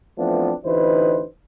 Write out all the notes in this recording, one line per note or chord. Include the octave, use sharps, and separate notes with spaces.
E3 F3 A3 B3 C4 D4
A1 D2 E3 D#4 B4 C5